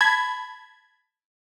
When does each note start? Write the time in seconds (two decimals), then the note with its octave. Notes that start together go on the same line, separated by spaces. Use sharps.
0.01 A5 B5 G#6